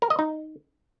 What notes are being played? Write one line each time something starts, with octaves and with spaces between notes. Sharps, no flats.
A#4
D#5
D#4